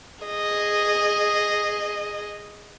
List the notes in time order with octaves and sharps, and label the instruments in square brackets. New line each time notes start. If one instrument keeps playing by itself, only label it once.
[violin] G#4 D#5